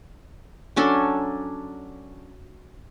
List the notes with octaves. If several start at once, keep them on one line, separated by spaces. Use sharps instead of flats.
F#3 C#4 D4 A4